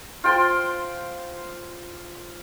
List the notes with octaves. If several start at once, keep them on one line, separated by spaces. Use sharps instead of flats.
F4 C5 G5 C6